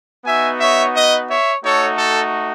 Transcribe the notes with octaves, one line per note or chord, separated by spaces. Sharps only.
B3 D#4 F#4 E5 G#5
C#5 E5
B4 D#5
C#5 E5
A3 D#4 F#4 A4 C#5
A4